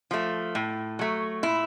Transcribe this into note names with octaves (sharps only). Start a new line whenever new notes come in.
F3 A3
A2
F#3 A3
A#2 E4